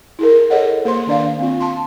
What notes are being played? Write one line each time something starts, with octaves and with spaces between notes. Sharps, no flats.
E4 G#4 A#4
G#4 A4 C#5 D#5 F#5
A#3 C5 C6
D#3 D4 D5 F5
C4 F4
A5 C6